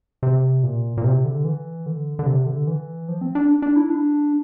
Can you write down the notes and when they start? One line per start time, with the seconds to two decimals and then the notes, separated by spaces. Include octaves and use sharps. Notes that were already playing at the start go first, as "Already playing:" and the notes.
0.23 C3
0.63 A#2
0.97 A#2
1.04 C3
1.25 D3
1.45 E3
1.86 D3
2.19 D3
2.26 C3
2.46 D3
2.67 E3
3.08 F3
3.21 C4
3.35 D4
3.62 D4
3.76 E4
3.90 D4